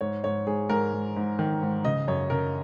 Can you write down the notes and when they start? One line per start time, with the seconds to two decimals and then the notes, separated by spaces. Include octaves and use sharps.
0.01 G#2 C#5
0.24 G#2 C#5
0.46 G#2 G#4
0.69 G#2 A#4
0.93 G#2
1.16 G#2
1.39 D#3
1.62 G#2
1.85 C#3 D#5
2.08 F#2 C#5
2.30 C#3 A#4